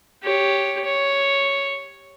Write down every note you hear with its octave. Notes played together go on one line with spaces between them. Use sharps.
G4 C#5
C#5